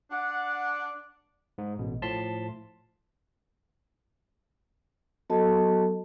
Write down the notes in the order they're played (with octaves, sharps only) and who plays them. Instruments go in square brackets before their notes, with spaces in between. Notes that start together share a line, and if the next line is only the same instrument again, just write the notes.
[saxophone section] D4 D5 F#5
[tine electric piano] G#2
A1 B2
A2 F3 A5 C6 B6
[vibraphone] F#3 B3 F#4 A4 D#5 A5